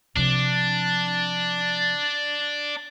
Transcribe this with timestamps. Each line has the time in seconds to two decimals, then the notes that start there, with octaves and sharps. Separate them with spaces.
0.16 C3 F3 D4